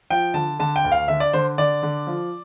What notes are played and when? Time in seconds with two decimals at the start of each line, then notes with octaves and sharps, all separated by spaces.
0.10 F3 G5
0.34 D3 A5
0.59 D3 A5
0.76 G5
0.85 D2
0.92 F5
1.08 D3 E5
1.20 D5
1.33 D3 C5
1.58 D3 D5
1.83 D3
2.07 F3